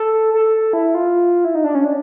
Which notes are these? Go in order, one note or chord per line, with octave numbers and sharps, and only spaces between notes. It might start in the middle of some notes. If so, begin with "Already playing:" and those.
Already playing: A4
A4
E4
F4
E4
D#4
D4
C#4
D4